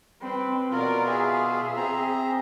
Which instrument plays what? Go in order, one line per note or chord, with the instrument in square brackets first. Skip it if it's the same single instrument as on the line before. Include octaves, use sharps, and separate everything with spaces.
[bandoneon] G3 [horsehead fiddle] C4 B4
[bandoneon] B2 F4 [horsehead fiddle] A#4 D5
[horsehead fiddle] G#4 E5
[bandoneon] C4 A#5